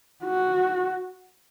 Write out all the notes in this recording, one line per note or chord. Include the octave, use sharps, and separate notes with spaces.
F#4